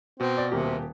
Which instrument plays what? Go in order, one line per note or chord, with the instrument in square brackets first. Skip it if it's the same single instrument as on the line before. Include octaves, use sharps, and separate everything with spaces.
[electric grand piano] B2 F#4 [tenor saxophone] C4
[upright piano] D5
[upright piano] D#1 A#3 G4 [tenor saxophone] C3